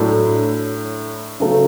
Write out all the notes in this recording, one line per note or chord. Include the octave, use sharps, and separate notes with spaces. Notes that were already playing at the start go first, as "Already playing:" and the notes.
Already playing: A2 F#3 A3 D4
C#3 F#3 A3